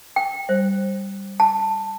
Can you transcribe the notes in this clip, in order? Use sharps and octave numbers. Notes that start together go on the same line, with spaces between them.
G5
G3 C5
A5